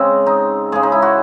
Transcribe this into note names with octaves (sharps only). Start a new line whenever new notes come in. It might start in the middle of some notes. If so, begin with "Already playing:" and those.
Already playing: C#3 G#3 C4
D#4
C#3 G#3 G#4
D#4
E4
F#4